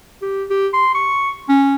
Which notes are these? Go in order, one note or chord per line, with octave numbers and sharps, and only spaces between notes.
G4
G4
C6
C#6
C#4